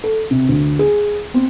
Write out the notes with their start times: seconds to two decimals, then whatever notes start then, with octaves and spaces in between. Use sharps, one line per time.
0.04 A4
0.31 C3
0.49 D2
0.79 G#4
1.34 C4